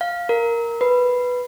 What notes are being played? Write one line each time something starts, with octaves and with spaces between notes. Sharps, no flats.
F5
A#4
B4